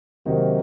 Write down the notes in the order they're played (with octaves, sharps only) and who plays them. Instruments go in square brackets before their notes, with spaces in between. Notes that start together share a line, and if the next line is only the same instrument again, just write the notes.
[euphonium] C3 [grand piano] D#3 F#3 A#3 D#4 F#4